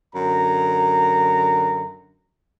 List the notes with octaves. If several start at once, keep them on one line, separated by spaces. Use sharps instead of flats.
F#2 D3 A#5